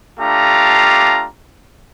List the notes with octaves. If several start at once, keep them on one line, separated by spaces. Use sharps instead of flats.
A3 D4 F4 G4 F5 A#5